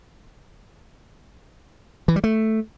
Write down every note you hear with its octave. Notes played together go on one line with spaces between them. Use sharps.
E3
G3
A3